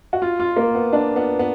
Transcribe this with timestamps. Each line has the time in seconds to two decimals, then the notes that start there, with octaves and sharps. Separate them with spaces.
0.13 F#4
0.22 F4
0.40 F4
0.57 A#3
0.75 B3
0.93 D4
1.16 B3
1.39 B3